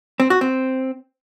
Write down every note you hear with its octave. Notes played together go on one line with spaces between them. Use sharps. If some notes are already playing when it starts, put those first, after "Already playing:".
C4
F#4
C4